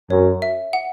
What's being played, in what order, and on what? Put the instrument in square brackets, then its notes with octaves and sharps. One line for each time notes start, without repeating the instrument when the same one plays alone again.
[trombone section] F#2 [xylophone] C#5
[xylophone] E5
F#5